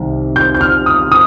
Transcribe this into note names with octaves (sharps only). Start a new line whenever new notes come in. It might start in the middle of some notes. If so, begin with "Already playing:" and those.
Already playing: C2 C3 D#3
G6
G6
F6
D#6
D#6